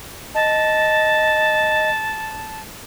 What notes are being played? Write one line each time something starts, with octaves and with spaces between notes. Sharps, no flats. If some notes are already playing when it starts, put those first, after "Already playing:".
D#5 A5